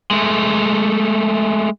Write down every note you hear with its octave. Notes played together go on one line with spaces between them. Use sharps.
G#3 A3